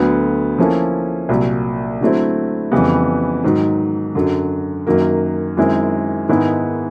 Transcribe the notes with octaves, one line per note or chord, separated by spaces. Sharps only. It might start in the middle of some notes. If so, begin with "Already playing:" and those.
Already playing: D2 D3 F#3 B3
F3 A#3 C#4 E4 A4
C2 A#2 F#3
D3 F#3 A3 C4 E4
F2 C#3 E3 G3 B3
G#2 D#3 F#3
F#2 D3 F#3
F#2 D#3 F#3 A#3
F#2 D#3 G#3 C4 E4
G#2 D#3 G#3 B3 E4